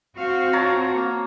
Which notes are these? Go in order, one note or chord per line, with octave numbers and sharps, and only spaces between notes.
C4 F#4 F5
C#5 A5 A#5
A#3